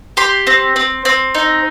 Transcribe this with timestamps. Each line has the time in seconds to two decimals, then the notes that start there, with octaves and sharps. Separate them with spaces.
0.17 G4 C6
0.47 C4
0.76 C4
1.05 C4
1.35 D#4